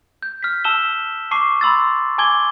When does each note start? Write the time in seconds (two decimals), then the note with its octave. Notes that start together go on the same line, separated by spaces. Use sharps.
0.22 G6
0.43 F6 B6
0.64 A5 E6 E7 G7
1.31 A5 C#6 D6 C7
1.61 B5 C6 E6 A6
2.18 G#5 A5 D6 G#6 G7